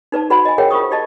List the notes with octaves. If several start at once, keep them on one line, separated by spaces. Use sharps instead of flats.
D#4 B4 D5 A5
F#4 B4 D5 F#5 B5
D#5 G#5
G#4 A#4 C#5 E5 F#5 G5
F4 A#4 C5 C#6 D#6
G4 D5 D#5 A5